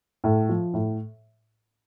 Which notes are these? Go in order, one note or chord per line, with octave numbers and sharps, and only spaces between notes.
A2
F3
A2